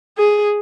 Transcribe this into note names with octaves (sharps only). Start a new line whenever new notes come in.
G#4